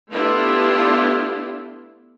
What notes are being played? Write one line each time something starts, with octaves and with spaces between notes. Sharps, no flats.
A3 B3 D4 E4 F4 G4